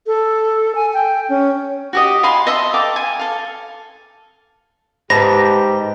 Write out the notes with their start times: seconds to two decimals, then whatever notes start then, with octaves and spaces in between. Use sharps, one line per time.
0.06 A4
0.75 G#5
0.93 G5
1.29 C#4
1.93 F#4 G4 D#5
2.23 F5 G#5 B5 C6
2.47 D#5 E5 A5 C6
2.74 A4 F5 G5 D6
2.96 G#5
3.19 A4 F5
5.10 G#2 G4 B4 A5 B5 A#6